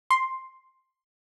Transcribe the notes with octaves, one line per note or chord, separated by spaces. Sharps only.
C6